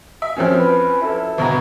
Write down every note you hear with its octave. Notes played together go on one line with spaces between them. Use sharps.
E5
F#2 F3 C4 C#4
B4
F#2 E4 A4
G1 B2 A#5